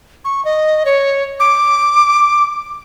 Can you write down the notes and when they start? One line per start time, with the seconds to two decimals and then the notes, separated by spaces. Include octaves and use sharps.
0.25 C#6
0.45 D#5
0.85 C#5
1.40 D6